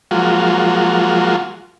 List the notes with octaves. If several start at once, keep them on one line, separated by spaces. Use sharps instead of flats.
F3 F#3 G#3 A#3 F4 F#4